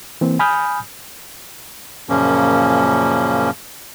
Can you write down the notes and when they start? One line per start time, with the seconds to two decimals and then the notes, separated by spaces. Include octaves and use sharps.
0.21 E3 A#3 C4
0.39 G#5 B5 D#6 F6 G6
2.09 F#2 A#2 C#3 F3 A#3 C#4